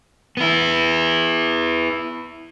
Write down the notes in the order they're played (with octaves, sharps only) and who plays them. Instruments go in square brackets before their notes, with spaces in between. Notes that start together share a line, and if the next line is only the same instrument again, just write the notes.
[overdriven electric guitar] B3 E4